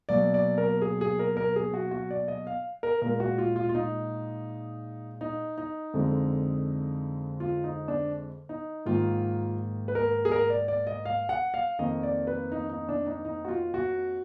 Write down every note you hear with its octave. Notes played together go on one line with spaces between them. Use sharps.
B2 F#3 A#3 D5
D5
A#4
G#4
G#4
A#4
A#4
G#4
F#4
F#4
D5
D#5
F5
A#4
A#2 G#3 A#4
F#4
F4
F4
F4
D#4
D#4
D#4
F2 D3 G#3
F4
D#4
D4
D#4
G#2 D#3 A#3 F4
B4
A#4
G#4
A#4
D5
D5
D#5
F5
F#5
F5
F2 D#3 A#3 D#5
D5
B4
D#4
D#4
D4
D#4
D#4
F#4
F4
F#4